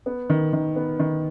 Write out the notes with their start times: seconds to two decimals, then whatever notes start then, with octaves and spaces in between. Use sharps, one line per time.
0.06 B3
0.30 D#3
0.53 D#3
0.76 B3
0.99 D#3